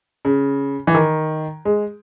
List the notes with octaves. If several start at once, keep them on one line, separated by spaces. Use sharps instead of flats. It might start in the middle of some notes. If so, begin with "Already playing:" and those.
C#3
E3
D#3
G#3